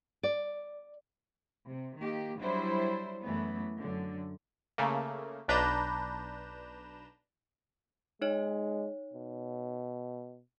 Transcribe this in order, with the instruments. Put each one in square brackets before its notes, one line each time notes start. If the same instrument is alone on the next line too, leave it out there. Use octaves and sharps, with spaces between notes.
[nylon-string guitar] D5
[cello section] C3
D#3 A#3 G4
F#3 G3 D4 E4 C5
F#2 E3 A3 B3
F#2 D3
[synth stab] C#3 A3 A#3
B1 D4 B4 A#5 G6 E7
[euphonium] G#3 [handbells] D#4 C#5
[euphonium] B2